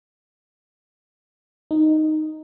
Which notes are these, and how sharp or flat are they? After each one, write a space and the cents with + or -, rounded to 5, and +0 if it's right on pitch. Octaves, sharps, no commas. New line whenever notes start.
D#4 -5